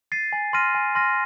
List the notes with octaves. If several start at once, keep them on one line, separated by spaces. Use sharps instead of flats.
A6 C7 D#7
G#5
C6 F6 A#6 D#7
G#5
C6 F6 A#6 D#7